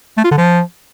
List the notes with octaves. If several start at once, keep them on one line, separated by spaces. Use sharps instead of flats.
A3
F4
D3
F3